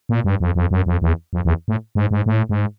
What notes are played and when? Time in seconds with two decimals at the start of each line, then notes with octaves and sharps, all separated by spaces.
0.09 A#2
0.24 G2
0.40 F2
0.55 F2
0.71 F#2
0.86 F2
1.02 E2
1.33 F2
1.45 E2
1.68 A2
1.95 G#2
2.11 G#2
2.26 A2
2.49 G#2